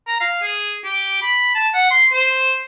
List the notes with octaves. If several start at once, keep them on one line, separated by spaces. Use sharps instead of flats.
A#5
F5
G#4
G4
B5
A5
F#5
C6
C5